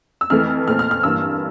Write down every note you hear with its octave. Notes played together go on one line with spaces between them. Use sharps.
E6
F2 E3 A3 F6
A#2 A3 C4 F6
F6
F6
G2 E3 A#3 E6